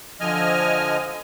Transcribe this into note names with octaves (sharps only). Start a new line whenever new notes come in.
D3 F3 D#5 G#5 F6